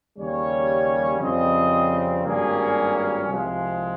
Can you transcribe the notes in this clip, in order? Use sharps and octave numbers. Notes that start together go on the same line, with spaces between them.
D#2 C#3 G3 C#4 C#5
F2 C#3 G3 C4 D#5
G#1 G2 G3 A#3 C#4 G#4
C2 C3 F3 G#3